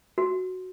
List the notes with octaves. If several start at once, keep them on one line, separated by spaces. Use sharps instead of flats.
F#4